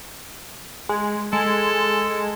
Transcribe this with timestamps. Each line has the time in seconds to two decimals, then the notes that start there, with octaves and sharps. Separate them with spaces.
0.89 G#3
1.33 G#3 A4